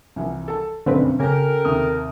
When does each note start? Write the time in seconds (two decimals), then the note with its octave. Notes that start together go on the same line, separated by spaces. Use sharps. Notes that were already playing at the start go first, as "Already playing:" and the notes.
0.16 C2 E3 F3
0.48 A4 A5
0.86 F1 B1 F#2 D3 C4 B4
1.20 C#3 G4 A4 A#4 G#5
1.65 D#2 C3 D#6